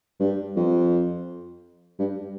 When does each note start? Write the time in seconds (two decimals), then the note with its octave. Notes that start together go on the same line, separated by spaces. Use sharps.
0.20 G2
0.56 F2
1.99 G2